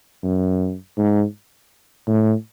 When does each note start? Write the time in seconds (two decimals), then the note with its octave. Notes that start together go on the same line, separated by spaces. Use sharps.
0.23 F#2
0.98 G#2
2.08 A2